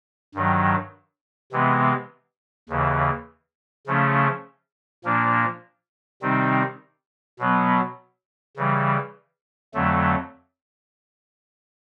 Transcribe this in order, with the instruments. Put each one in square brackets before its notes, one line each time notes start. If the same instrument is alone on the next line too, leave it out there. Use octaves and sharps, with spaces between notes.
[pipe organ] G2 D#3 F#3
C3 E3 G#3 B3
D#2 C#3 E3
C#3 F3 A3 C#4
A#2 F3 A#3 D4
C3 D#3 G3 C4 D#4
B2 F#3 B3
C#3 E3 G3
F2 D3 F#3 A3